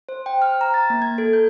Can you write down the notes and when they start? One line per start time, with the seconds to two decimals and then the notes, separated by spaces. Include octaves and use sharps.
0.09 C5
0.26 G5
0.42 F6
0.61 A#5
0.74 A6
0.90 A#3
1.02 G#6
1.18 A4
1.33 G6